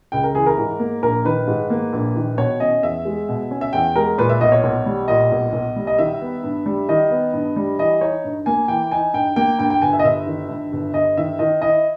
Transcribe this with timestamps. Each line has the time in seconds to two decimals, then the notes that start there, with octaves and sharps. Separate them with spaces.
0.12 C#2 G5
0.24 A#4
0.35 E3 G#4
0.46 A#4
0.58 G#2
0.80 A#3
1.02 A#1 A#4
1.25 D#3 B4
1.47 G#2
1.70 A#3
1.93 A#1
2.16 D#3
2.38 B2 C#5
2.60 C#4 D#5
2.83 E2 E5
3.05 G#3
3.29 B2
3.51 C#4
3.61 E5
3.73 E2 G5
3.95 G#3 A#4
4.18 A#2 B4
4.29 E5
4.41 B1 D#5
4.52 C#5
4.64 B1
4.86 G3
5.08 A#2 D#5
5.31 B1
5.53 B1
5.76 G3
5.87 D#5
5.98 D#3 E5
6.21 B3
6.44 G2
6.66 G3
6.89 D#3 D#5
7.11 B3
7.33 G2
7.56 G3
7.78 E3 D#5
8.01 D#4 C#5
8.24 G2
8.46 A#3 G#5
8.68 E3 G5
8.91 D#4 G#5
9.13 G2 G5
9.36 A#3 G5
9.59 G2 G5
9.70 G5
9.82 G1 G#5
9.93 E5
9.99 D#5
10.04 G1 E5
10.27 D#3
10.49 G2
10.72 G1
10.94 G1 D#5
11.17 D#3 E5
11.39 D#3 D#5
11.62 E4 D#5